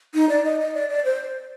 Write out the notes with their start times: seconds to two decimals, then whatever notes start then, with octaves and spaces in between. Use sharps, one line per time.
0.14 D#4
0.29 D5
0.45 D#5
0.60 D#5
0.74 D5
0.89 D5
1.05 C5